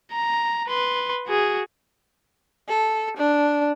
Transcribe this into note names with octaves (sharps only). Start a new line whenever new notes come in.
A#5
B4 C6
F#4 G#4
A4
D4